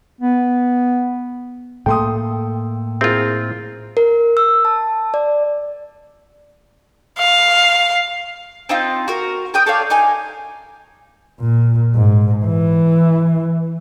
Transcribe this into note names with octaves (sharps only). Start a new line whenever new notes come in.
B3
A2 A3 A#3 A4 G5 C6 D#6
C4 E4 F4 G#4 A#4
A#4
E6
A5
D5
F5
C4 D#4 F4
F#4 A#4
A#4 G5 D#6
A4 C#5 D5 F5
D#4 A#4 G#5
A#2
G#2
E3